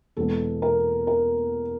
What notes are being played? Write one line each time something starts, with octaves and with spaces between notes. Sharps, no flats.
E2 B2 G#3 B3 A4
A#4
A#4